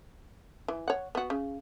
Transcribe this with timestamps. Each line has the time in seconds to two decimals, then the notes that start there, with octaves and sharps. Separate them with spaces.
0.68 E3
0.88 C#5 F#5
1.15 B3 F#4
1.30 C#3